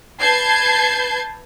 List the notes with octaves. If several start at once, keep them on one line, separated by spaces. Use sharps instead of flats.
B4 A5 G6 G#6 C7